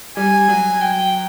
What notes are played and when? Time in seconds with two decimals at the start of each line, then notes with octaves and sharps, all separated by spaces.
0.17 G3 G#5
0.48 F#3
0.81 G5